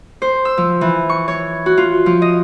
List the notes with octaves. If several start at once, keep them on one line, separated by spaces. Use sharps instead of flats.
C5
E6
F3
E3
C#6
C#5
F#4
F4
F3
D#5